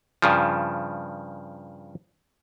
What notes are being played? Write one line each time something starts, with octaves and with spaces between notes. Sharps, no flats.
G2 C#3 F3